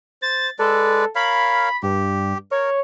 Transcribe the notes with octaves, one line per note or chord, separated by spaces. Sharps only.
C5 A6
G#3 A4 B4 D5
A#4 C#5 F5 B5
G2 G4
A#4 C#5